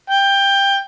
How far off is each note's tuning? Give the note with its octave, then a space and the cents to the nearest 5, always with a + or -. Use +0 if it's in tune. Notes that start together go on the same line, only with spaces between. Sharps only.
G5 +15